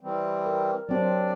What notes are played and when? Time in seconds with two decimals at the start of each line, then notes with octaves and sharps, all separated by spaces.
0.01 E3 G3 C4
0.46 A#4
0.89 F#3 C4 D4 G4 D5